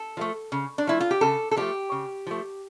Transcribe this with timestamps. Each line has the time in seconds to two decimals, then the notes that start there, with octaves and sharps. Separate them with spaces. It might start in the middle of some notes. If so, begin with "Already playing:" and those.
Already playing: A4
0.17 F3 A3
0.52 C#3
0.78 D4
0.87 F3 A3 E4
1.00 F4
1.11 G4
1.21 C#3 A4
1.51 A4
1.57 F3 A3 G4
1.92 C#3
2.27 F3 A3